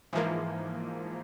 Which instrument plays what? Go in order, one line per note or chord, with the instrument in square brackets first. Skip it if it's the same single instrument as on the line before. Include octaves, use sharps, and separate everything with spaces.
[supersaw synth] G#2 F3 A#3 [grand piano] E3